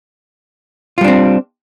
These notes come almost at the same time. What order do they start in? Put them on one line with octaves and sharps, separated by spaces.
F4 G3 D4 C4